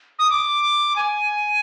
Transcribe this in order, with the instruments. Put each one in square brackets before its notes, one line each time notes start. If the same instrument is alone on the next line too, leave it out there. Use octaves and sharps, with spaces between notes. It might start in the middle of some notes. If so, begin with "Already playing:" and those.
[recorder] D#6
D6
G#5